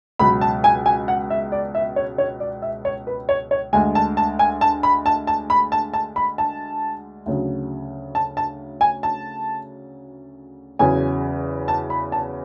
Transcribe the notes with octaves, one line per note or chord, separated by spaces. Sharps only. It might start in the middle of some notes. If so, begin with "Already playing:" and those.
C#2 B2 F#3 B5
A5
G#5
G#5
F#5
E5
D5
E5
C#5
C#5
D5
E5
C#5
B4
C#5
C#5
D2 D3 G#3 G#5
A5
A5
G#5
A5
B5
A5
A5
B5
A5
A5
B5
A5
D2 C#3 F#3
A5
A5
G#5
A5
E2 C#3 F#3 G#5
A5
B5
A5